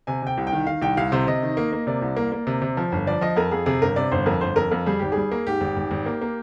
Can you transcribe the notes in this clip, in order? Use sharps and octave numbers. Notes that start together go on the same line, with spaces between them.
C3 G#5
C3 G5
C2
G5
D#3
D#3 F5
C2 G5
C2 F5
C3 C5
C3 D#5
D#3
A#3
A#3
C3 D5
C2
A#3
A#3
C3
C3
F3
G1
F3 D5
F3 D#5
F2 A#4
F2 G#4
C3 G#4
G1 A#4
C3 D5
G1 C5
F2 A#4
G1 C5
F2 A#4
F2 A#4
G3 G#4
G#1 G4
G3 G#4
A#3
G#2 G4
G#1
G#1
G#1
A#3
A#3